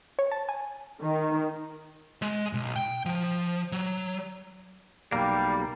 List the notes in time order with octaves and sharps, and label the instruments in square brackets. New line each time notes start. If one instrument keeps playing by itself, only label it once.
[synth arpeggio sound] C#5
A5
G#5
[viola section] D#3
[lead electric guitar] G#3
B1
G5
F3
F#3
[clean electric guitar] B1 A#3 [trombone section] G3